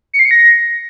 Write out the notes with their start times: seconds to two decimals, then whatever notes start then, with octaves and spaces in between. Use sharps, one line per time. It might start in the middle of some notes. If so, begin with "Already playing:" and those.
0.13 C#7
0.19 C7
0.25 C#7
0.31 A#6